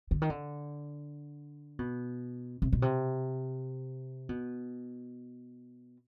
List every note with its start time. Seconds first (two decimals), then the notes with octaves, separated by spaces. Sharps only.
0.11 D3
0.22 D#3
0.30 D3
1.79 B2
2.62 C3
2.72 B2
2.82 C3
4.29 B2